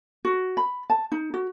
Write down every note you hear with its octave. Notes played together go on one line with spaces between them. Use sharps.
F#4
B5
A5
D#4
F#4